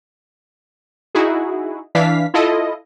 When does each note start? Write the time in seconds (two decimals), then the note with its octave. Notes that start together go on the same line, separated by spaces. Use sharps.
1.15 D#4 E4 F#4 G#4
1.95 E3 D4 F5 B6
2.34 E4 F4 A4 D#5